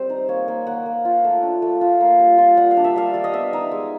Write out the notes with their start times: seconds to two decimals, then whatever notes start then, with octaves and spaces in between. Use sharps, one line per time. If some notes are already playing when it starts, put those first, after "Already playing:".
Already playing: G3 C4 C5
0.10 D#4
0.29 A#3 C#5
0.48 A#3
0.67 A#3 F#5
0.86 A#3
1.05 F4
1.24 A3
1.43 D4
1.62 A3
1.81 F4
2.01 A#3
2.19 G3
2.38 F4
2.57 G3 F#5
2.71 F5
2.77 D4
2.84 E5
2.96 G3 F5
3.14 G3 D5
3.24 D#5
3.34 B3 E5
3.53 D#4
3.72 G#3